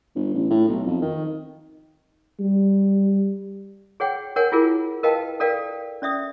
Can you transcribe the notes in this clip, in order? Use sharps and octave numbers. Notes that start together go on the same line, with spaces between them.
G1
A1
A2
B1
F2
D#3
G3
G#4 C#5 F#5 G5
A#4 C#5 F#5 G#5
E4 F4 G#4 A#4
A#4 B4 D#5 F5 G5 A5
A4 A#4 D5 F5 G5
C#4 D5 E5 D#6